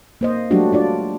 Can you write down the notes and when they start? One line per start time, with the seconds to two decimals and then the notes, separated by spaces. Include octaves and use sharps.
0.21 A#3 C5 D#5
0.51 F#3 G3 A3 D4 F#4 G4
0.73 D4 F4 D5